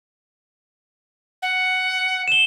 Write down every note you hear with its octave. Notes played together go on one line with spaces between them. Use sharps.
F#5
E7 G7